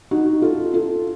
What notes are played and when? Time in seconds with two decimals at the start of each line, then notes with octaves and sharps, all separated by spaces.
0.11 D#4 F#4
0.42 F4 A4
0.74 F4 A4